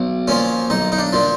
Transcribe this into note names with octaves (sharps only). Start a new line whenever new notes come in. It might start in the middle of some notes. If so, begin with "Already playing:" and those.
Already playing: B1
A#2 F3 C#4
B1 D#4
D#4
D4
A#2 F3